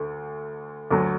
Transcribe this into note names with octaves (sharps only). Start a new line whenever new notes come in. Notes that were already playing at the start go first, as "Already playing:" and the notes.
Already playing: D2 D3
D2 D3 F#3